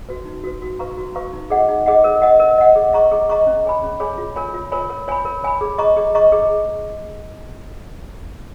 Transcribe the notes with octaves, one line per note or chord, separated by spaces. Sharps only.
F#4 B4
D#4
F#4 B4
F#4
B4 F5 A#5 C#6
F#4
B4 F5 A#5 C#6
D#4
G#4 D#5 F#5
D#4
G#4 D#5 F#5
A#4
D#5 F#5
A#4
D#5 F#5
G#4
D#5 A#5 C#6
G#4
D#5 A#5 C#6
C#4
G#4 C#5 G#5 B5
C#4
G#4 C#5 G#5 B5
F4
A#4 C#5 G#5 B5
F4
A#4 C#5 G#5 B5
A#4
C#5 G#5 B5
A#4
C#5 G#5 B5
G#4
D#5 A#5 C#6
G#4
D#5 A#5 C#6
G#4